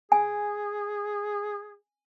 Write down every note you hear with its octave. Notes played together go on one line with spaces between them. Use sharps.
G#4 G#5